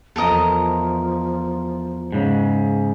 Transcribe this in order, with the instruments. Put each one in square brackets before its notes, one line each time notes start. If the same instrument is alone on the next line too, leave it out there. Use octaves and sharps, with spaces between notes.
[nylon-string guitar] E2 [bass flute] F3 [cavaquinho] A4 A#4 D#5
[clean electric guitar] G#2 C#3